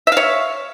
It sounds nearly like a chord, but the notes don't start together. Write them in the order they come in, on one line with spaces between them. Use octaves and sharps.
E5 F5 C#5